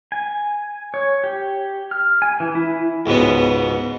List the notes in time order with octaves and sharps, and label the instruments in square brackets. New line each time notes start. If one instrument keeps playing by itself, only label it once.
[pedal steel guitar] G#5
C#5
G4
F6
G#5
E3
E4
[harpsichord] C#2 G#2 B2 B3